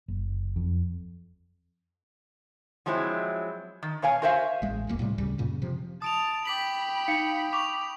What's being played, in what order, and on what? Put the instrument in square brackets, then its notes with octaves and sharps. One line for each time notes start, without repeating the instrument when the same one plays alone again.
[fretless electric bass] F#1
F2
[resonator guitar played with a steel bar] F3 F#3 G#3 C4 E4
D#3
B2 C#5 F5 G#5
F#4 A#4 C5 E5 F5 G#5
[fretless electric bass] A1 G#3
E1 C2 F#2 A#3
A2 C3 G3
D2 C#3 G3
F#2 A#2 C#3
C3 F3
[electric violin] A5 [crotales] D#6 D7 F7
[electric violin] G5 B5 [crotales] D6 B6 F#7
[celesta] D#4 F5 C#7
[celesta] C#6 D6 [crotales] F7